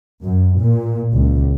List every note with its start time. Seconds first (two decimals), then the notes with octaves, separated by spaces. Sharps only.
0.22 F#2
0.59 A#2
1.15 C#2